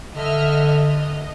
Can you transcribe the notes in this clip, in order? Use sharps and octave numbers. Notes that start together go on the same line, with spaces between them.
D3 D#5 E5 F6
D#5